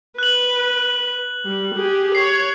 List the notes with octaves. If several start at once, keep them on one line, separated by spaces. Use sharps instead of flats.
B4 F#6 F#7
G3
G4 G#4
C#5 C7